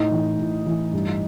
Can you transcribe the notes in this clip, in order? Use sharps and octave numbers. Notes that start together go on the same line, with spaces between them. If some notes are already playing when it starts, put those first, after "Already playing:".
Already playing: A2 D#4
E3
A2
E3
G2